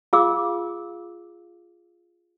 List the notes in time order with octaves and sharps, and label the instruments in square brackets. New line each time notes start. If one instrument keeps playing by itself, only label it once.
[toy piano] F4 G#4 F5 D6 E6